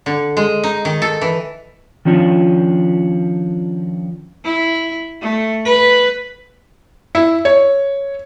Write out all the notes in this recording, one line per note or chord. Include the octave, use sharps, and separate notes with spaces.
D3
G#3
D#4
D#3
A4
E3
D#3 F3 C#4 D4 F4
E4
A3
B4
E4
C#5